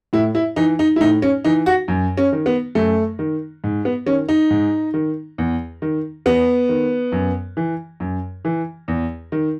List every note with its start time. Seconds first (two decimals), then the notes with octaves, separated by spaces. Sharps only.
0.13 A2 E4
0.35 E4
0.56 E3 D#4
0.79 D#4
0.96 E4
1.00 A2 D#4
1.22 C#4
1.44 E3 D#4
1.66 F#4
1.88 F#2
2.17 C#4
2.32 D#3
2.46 B3
2.75 F#2 A3
3.19 D#3
3.64 G#2
3.85 B3
4.06 D#3 C#4
4.29 D#4
4.50 G#2
4.94 D#3
5.38 E2
5.82 D#3
6.26 E2 B3
6.69 D#3
7.12 F#2
7.57 E3
8.00 F#2
8.45 E3
8.88 E2
9.32 D#3